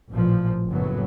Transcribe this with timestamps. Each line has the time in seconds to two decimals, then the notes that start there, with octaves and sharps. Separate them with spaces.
0.10 A1 A#2 F3
0.68 F#1 A2 F#3 B3